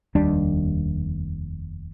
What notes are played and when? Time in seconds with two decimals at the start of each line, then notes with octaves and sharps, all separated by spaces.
0.15 F1 D#2 G3 D4